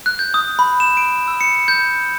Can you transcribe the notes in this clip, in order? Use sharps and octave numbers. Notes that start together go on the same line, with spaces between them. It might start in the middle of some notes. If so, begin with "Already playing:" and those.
F#6
G6
D#6
B5
E7
D7
E6
C#7
C#7
G6